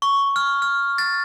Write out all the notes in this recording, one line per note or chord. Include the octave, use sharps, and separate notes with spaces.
C#6
F6
F6
A6